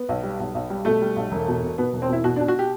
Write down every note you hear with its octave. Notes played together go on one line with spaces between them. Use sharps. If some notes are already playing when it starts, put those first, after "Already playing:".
Already playing: B3
B1
G3
B1
B1
G3
B2 A3
G3
B1
E1
B2
B2
B2 B3
E1
C4
B2 E4
B2 F#4
B2 D4
F#4
G4